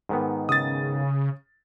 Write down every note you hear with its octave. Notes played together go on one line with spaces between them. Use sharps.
G#2 D#3 B3
C#3 D#6 A6